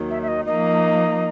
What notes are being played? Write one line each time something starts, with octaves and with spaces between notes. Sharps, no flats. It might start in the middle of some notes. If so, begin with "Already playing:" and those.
Already playing: D#2 D#3 F#3
E5
E5
D#5
F3 A#3 D#4 D#5